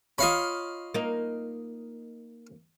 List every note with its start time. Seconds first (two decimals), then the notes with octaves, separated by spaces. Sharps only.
0.18 F4 C#5 D#5 F5 B5
0.94 A#3 D#4